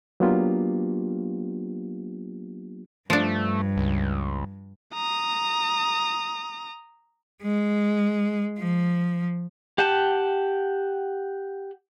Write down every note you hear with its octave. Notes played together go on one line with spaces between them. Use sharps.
F#3 A#3 B3 D4 F4 G4
G2 F3 A3 D4
C#2
A#5 D#6
G#3
F3
G4 F#5 G5 A5